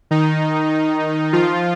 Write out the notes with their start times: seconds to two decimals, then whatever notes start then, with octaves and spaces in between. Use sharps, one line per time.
0.11 D#3 D#4
1.33 F3 F4